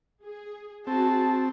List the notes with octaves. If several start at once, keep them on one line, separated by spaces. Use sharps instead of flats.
G#4
C4 F#4 G#4 A5